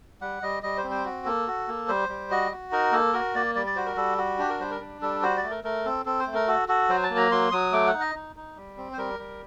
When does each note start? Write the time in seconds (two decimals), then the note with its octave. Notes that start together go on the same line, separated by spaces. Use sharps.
0.21 G3 F#5
0.42 G3 D#5
0.63 G3 D#5
0.77 C5
0.84 C4
0.91 C5
1.05 F#4
1.25 A#3 A4
1.47 F#4
1.68 A#3
1.88 G3 C5
2.09 G3
2.31 F#4 D#5
2.51 F#4
2.72 D#4 A#4
2.92 A#3 A4
3.13 F#4 A#4
3.35 A#3 D5
3.55 G3 D5
3.66 D5
3.76 F#4 C5
3.86 A#4
3.97 G3 A4
4.18 F#4
4.39 D4 G4
4.49 A#4
4.60 G3 C5
4.71 A#4
4.80 D4
5.02 G3 A4
5.22 F#4 C5
5.37 D5
5.43 A3
5.50 A#4
5.64 A3 A#4
5.85 C4 A4
6.06 C4 A4
6.19 C5
6.27 A3
6.34 A#4
6.47 F#4 A4
6.68 F#4 A4
6.89 F#3 C5
7.03 A5
7.10 A#3
7.17 A#5
7.32 F#3 C6
7.52 F#3 D#6
7.72 A3 D6
7.87 F#5
7.94 D#4
8.00 D#5
8.15 D#4
8.36 D#4
8.56 G3
8.77 C4
8.93 C5
8.97 G3 A#4
9.19 G3